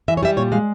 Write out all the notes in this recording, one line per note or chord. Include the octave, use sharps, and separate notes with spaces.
E3 E5
C#5
G3 E5
A#2 C#5
G#3 F5